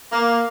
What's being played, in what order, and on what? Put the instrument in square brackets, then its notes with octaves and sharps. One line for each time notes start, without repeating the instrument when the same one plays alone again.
[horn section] A#3